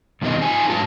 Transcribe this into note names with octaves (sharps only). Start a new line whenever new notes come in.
G2 B2 D#3 G3 C4 D#5
D#4 F4 G#4 C5 G#5
G#2 F#3 A3 B4 A5